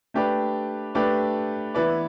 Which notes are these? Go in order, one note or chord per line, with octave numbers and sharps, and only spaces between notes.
A3 D4 G4 B4 D5
A3 D4 G4 B4 D5
E3 B3 E4 B4 D5